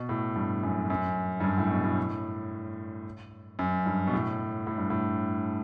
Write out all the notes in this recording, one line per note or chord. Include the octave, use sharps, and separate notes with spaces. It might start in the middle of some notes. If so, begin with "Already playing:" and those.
Already playing: B2
A2
G2
F#2
F#2
G2
F#2
A2
B2
A2
F#2
G2
B2
A2
A2
G2
A2